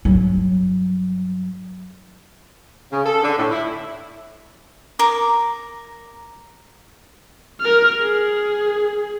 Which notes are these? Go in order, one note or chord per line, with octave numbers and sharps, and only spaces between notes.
G2 F#3
C#3
A4
D3
A2
E4
A#4 D6
A#4 F6
G#4